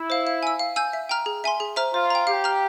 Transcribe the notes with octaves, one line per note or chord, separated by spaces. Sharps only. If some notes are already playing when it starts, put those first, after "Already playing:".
Already playing: E4
C5 F5
F5
G#5 E6
F5
G#5 E6 G6
E5
G5 A#5 F6
G#4
E5 G#5 C6
G#4
C5 E5 A#5 F6
F4 C5
G5 A#5
G4 F5
A#5 F6